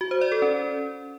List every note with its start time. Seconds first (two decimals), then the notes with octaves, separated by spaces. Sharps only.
0.01 F#4
0.11 C5
0.21 D5
0.32 A4
0.42 C#4